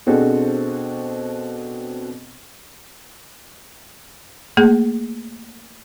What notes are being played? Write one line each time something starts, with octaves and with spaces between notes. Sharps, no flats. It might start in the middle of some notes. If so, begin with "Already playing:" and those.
B2 C4 D4 F#4 G#4 A4
A3 A#3 G#4